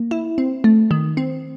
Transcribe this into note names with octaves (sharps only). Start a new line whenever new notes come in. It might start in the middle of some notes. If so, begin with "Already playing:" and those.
Already playing: A#3
E4
C4
A3
D#3
C4